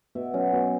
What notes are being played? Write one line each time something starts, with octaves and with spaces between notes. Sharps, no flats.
B2 E5
F#3 C#4
B2